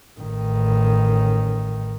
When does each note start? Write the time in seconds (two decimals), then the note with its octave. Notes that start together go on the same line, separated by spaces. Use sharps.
0.21 A1 D#3